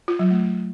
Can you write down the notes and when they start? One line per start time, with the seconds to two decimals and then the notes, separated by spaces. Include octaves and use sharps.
0.08 F4
0.19 F#3
0.31 A3